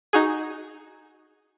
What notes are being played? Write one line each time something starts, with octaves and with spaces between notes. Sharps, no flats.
D#4 F#4 G#4